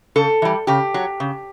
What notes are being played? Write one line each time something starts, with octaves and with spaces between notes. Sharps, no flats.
C#3 A4
E3 G3
C#3 G4
F#3
C#3